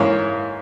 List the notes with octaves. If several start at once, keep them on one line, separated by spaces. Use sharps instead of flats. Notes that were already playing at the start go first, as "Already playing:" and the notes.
Already playing: G#2 E3 A#3 C#4 C#5 F5